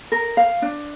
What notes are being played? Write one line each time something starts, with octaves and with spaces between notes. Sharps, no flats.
A#4
F5
D4